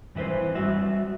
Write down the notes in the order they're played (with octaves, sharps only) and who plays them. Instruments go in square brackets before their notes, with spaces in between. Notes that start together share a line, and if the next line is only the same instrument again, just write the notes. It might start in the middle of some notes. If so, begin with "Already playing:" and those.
[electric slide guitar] G2 E3 E4 B4 C5
G3 F#4 E5